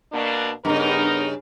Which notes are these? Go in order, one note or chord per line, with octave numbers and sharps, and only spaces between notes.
B2 A#3 D4
G2 C#3 B3 D#4 A#4